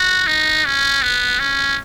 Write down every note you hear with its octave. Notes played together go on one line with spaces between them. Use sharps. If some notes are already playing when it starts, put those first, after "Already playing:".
Already playing: F#4
D#4
C#4
B3
C#4